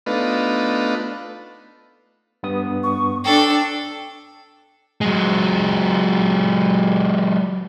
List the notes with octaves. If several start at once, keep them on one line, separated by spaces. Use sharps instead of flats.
A3 B3 D4 D#4 F4 B4
G2 B3 D#6
C#6
D4 A4 G5
F#3 G#3